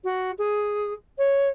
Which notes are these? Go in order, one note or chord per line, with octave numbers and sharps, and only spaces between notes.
F#4
G#4
C#5